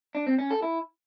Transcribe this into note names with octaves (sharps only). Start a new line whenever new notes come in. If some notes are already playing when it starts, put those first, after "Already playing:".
D4
C4
C#4
A4
E4